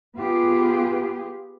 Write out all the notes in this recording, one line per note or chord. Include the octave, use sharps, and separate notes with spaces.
B3 F4 G4 G#4